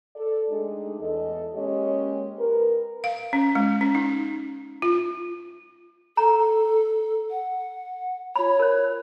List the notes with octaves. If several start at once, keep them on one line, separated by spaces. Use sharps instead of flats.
A4 D5
G#3 A3 D4 D#4 G4 G#4
E2 A4 D#5
G#3 A#3 C#4 G4 C#5 D#5
A#4 B4
F5
C#4
G#3
C#4
D#4
F4
A4 A#5
F#5
F4 C#5 B5
A#4 C5